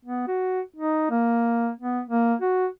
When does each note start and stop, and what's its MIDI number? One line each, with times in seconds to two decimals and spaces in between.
0.05 0.28 59
0.28 0.61 66
0.76 1.09 63
1.10 1.70 58
1.80 2.01 59
2.09 2.35 58
2.42 2.66 66